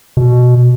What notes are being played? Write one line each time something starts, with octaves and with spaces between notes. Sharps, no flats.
B2